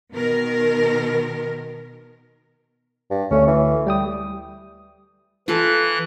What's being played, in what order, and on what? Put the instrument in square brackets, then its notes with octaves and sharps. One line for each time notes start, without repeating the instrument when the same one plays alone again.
[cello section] B2 D#3 A#4
[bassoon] G2
[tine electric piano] D2 A3 [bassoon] C#4
[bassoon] E3
[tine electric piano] G3 G5 D#6
[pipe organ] E3 F#6 [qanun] F4 A4